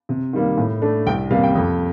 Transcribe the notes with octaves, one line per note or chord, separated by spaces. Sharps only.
C3
D#3 G3 A#3
A2
A3 D4
C2 G5
C3 G3 A#3 F5
G5
F2